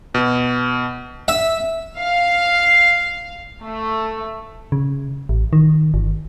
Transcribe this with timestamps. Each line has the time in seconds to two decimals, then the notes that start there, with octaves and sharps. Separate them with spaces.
0.14 B2
1.28 E5
1.97 F5
3.63 A3
4.72 C#3
5.29 A1
5.53 D#3
5.94 G1